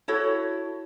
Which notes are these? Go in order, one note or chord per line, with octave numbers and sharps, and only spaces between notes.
E4 F#4 A4 C#5